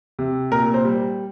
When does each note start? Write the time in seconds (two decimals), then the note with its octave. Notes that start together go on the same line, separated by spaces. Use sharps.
0.19 C3
0.52 A#2 A#4
0.74 C5
0.85 G3